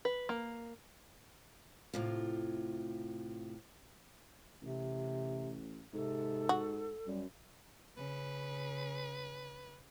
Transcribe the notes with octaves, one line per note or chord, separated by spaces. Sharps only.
B4
A#3
A2 C3 F4
A1 C3
G#2 C3 A4
F#4
F#2 G3
C#3 B4